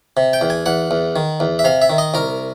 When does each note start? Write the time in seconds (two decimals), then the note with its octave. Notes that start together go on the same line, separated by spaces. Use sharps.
0.17 C3
0.33 G5
0.41 E2
0.50 G#5
0.66 E2 F#5
0.91 E2
1.16 D#3
1.40 E2
1.59 E5
1.64 C3 F5
1.82 E5
1.90 D#3
1.98 D#5
2.14 C2 A#4